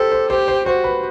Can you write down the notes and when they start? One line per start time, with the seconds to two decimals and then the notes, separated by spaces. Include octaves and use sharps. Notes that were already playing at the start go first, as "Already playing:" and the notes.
Already playing: G4 A4 C5
0.12 C5
0.29 G4 C5
0.48 C5
0.66 F#4 C5
0.84 B4